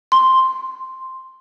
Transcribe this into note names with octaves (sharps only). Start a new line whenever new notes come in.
C6